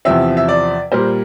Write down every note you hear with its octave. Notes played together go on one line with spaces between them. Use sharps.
E2 C3 F3 C4 E5
E5
D5
A#2 G3 A#3 C5